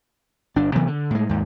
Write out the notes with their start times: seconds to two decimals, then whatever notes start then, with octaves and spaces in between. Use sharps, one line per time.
0.56 G1 D4
0.75 C3 E3 F#3 B3
0.87 D3
1.10 A2 G#3
1.29 D#2 G#2